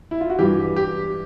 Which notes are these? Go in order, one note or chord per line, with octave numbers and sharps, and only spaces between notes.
E4
F4
F#4
G2 E3 G4
G4